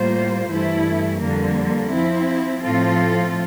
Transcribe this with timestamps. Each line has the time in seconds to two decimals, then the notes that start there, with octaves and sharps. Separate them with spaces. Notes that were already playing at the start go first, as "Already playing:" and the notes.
Already playing: A2 G3 A#3 F4 C5
0.50 G2 E3 A3 E4
1.21 F2 D3 G3 A#3
1.92 F3 C4 E4
2.62 A2 F3 C4 F4 A4